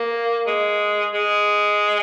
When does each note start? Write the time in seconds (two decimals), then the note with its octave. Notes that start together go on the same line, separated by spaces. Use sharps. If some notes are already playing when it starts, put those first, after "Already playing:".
Already playing: A#3
0.47 G#3
1.14 G#3